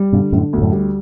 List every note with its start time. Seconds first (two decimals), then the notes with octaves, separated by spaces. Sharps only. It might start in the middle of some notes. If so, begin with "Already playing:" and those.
Already playing: G3
0.13 G2 B2 D3
0.32 F#2 A2 D3
0.53 D2 B2
0.62 F#2 A2
0.72 G3